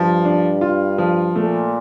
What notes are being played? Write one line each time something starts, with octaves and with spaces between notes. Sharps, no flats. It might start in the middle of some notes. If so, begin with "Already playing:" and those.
Already playing: G2 F3
D4
F4
F3
A#2 A3